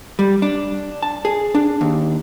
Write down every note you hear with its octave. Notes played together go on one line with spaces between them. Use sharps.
G3
D4
A5
G#4
D4
D#2